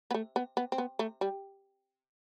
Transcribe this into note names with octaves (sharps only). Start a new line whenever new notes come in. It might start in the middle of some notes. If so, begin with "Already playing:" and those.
B3
A3
B3
B3
C4
B3
A3
G3